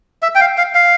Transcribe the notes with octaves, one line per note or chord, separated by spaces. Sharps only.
E5
G5
F5
F5
F5